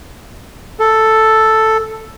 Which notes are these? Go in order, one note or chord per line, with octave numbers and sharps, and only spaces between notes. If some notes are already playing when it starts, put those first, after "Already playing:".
A4